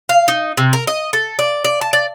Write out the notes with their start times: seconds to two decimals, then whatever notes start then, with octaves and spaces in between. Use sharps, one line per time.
0.09 F5
0.28 D#4
0.57 C3
0.73 A#4
0.87 D#5
1.13 A4
1.39 D5
1.64 D5
1.81 A5
1.93 D5